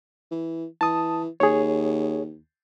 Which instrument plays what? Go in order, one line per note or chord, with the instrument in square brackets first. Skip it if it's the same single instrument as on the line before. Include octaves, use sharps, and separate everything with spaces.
[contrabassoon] E3
[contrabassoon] E3 [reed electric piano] A5 D#6
[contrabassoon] D#2 [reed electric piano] G#4 C#5